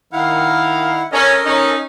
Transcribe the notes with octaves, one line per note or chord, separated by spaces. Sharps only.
D#3 E4 F5 F#5
C#4 A4 A#4 D#5
C#4 D#4